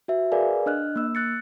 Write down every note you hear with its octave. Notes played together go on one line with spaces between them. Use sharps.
F#4 B4 E5
G#4 A#4 B4 D5 F5 G#5
D4 D#5 F6 F#6
A#3 E6
F#6 A6 C#7